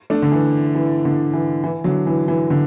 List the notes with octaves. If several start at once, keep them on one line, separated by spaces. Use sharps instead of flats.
A3 D4
D3
E3
E3
D3
E3
E3
D3 F#3
E3
E3
D3